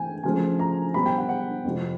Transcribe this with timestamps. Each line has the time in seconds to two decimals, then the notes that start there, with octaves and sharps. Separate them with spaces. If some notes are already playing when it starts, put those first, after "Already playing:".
Already playing: E3 A3 C4 G5 G#5
0.23 C#3 F3 A3 C4 G#5
0.59 A#5
0.94 B2 G3 C4 B5
1.06 G5
1.18 F#5
1.29 F#5
1.65 F2 C3 F3